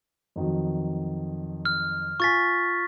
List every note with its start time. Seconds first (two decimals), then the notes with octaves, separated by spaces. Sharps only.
0.36 F2 D#3 F#3
1.65 F6
2.20 F4 G#5 C#6 A6 B6